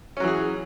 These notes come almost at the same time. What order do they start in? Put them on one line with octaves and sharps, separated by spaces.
C#4 F#3 E3 G#4